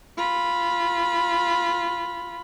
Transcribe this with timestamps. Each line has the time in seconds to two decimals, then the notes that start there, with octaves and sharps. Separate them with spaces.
0.18 F4 B5